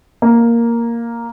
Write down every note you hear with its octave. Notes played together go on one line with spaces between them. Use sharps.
A#3